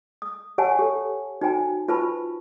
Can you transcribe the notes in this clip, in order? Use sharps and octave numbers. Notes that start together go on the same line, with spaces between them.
D#6
G4 C#5 F#5 G#5 A5
G4 A4 C#5
D#4 F#4 C5 G5 G#5 A#5
F4 B4 C5 A5 B5 C#6